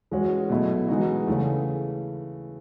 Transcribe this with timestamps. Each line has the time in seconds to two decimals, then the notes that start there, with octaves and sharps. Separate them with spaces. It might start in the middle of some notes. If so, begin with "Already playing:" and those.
0.11 E3 G#3 C#4 F#4
0.50 B2 F#3 A3 E4
0.88 E3 G#3 D#4 F#4
1.27 C#3 E3 A3